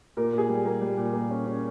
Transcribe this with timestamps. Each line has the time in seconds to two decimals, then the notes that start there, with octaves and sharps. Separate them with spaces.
0.17 A#2 A#4
0.33 A#2 G#4
0.49 G3
0.65 A#3
0.82 G3
0.98 A#2
1.13 A#3
1.31 C#4
1.46 C#4